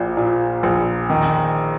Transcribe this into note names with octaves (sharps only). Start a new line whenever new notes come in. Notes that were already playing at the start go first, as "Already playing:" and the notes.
Already playing: A#1 A#2
A#2
A#1
D#3